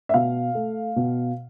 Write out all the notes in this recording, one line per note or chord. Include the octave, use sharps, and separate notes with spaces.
E5
B2 F5
A3
B2